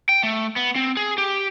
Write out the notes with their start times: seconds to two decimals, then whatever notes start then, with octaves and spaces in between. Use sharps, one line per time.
0.09 G5
0.23 A3
0.56 B3
0.76 C4
0.97 G#4
1.18 G4